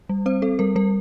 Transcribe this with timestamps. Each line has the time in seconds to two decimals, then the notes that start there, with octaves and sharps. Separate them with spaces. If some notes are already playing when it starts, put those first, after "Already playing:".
0.09 G3
0.26 C4 C5
0.42 C4 A4
0.59 G3 A#4
0.76 G3 A#4